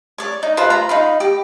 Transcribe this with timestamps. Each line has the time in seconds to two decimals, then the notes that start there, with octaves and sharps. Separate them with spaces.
0.18 C#5 D5
0.43 D#4
0.57 F4 B4 C5
0.70 F4 A#5 B5
0.89 D#4 F5 B5
1.20 G4